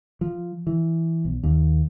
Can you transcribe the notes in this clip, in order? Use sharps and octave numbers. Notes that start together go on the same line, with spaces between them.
F3
E3
B1
D#2